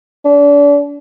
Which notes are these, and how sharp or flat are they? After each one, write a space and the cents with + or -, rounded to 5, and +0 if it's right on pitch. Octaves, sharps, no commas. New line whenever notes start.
D4 -35